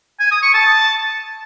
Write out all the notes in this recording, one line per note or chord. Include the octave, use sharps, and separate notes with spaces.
G#5
D#6
C#6
A5